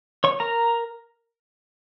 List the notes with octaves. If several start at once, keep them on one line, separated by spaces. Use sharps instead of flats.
C#5 C#6
A#4 A#5